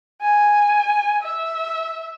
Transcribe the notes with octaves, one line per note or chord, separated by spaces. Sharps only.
G#5
E5